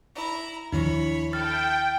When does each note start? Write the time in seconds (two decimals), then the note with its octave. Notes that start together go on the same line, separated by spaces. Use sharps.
0.14 E4 A#5
0.72 D#2 D#3 F3 D4 E4 C#5 B5
1.33 E4 A4 G5 F6 A6